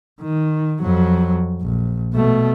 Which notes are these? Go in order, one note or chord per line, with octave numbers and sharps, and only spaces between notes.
D#3
F2 F#3
A#1
B2 A3